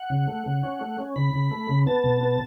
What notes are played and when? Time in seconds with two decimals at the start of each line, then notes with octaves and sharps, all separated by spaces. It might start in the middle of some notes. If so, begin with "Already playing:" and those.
Already playing: F#5
0.10 C#3
0.28 A3
0.46 C#3
0.63 C#4
0.81 A3
0.98 C#4
1.16 C#3 B5
1.33 C#3
1.51 A3
1.69 C#3
1.86 B3 A5
2.04 B2
2.21 B3